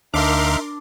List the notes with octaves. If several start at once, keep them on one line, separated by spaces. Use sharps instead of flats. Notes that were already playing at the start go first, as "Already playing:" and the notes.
D2 D4 D#4 A#4 E5 F5 C6 D6